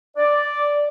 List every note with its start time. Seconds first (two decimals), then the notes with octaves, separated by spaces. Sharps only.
0.16 D5